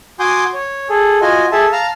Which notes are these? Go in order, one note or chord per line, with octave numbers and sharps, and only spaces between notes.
F#4 G#5 C6 D6 D#6 G6
C#5
G#4 A4
F4 F#4 D#5 G#5
G#4 A4 E5 A5
F5 A5 A#5 F6